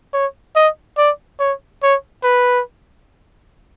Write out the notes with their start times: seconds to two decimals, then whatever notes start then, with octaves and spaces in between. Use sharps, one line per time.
0.14 C#5
0.55 D#5
0.98 D5
1.40 C#5
1.82 C#5
2.23 B4